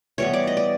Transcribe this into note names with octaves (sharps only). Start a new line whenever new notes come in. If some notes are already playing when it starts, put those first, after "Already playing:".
E3 G3 B3 C#5
D5
D#5
D5